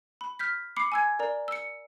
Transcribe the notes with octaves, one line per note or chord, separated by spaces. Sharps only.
B5
F6 G6 B6
B5 D6 C7 C#7
G#5 E6 G#6
A#4 D5 A#5
E6 C#7